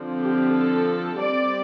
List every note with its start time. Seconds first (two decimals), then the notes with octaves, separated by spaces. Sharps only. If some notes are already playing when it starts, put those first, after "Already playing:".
Already playing: D3 F3 C4
0.19 G4
0.53 A4
1.20 G3 C4 D5